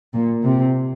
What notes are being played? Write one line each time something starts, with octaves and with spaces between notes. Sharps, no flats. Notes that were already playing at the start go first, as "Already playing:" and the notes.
A#2
C3